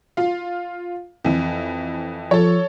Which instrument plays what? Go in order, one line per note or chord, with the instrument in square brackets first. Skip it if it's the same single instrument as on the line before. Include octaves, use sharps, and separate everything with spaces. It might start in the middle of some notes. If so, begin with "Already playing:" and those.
[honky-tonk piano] F4 F5
F2 E3
[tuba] F3 [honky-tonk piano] A4 C#5